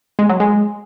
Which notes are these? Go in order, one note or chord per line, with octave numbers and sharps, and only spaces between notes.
G#3
F#3
G#3